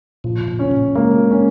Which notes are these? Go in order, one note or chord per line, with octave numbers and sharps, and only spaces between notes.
A#2 F3
A#2
C#4
A#2
G#3 A#3
C#4